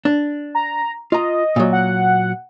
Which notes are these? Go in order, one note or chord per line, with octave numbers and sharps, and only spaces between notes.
D4
A#5
F4 D#5 A#5
A#2 F#3
F#5